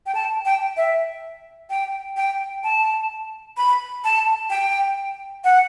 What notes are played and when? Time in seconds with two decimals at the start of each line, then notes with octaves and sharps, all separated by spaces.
0.06 G5
0.15 A5
0.45 G5
0.77 E5
1.70 G5
2.17 G5
2.64 A5
3.57 B5
4.04 A5
4.50 G5
5.44 F#5